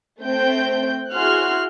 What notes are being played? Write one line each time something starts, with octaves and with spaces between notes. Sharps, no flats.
A3 C4 G5 G6
E4 F#4 G#4 C6 F6 F#6